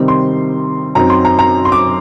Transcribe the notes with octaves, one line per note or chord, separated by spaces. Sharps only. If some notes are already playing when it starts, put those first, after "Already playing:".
Already playing: C3 D#3 G3 C4 D#4
C6
F#2 F#3 C4 D#4 A#5
C6
A#5
A#5
C6
D6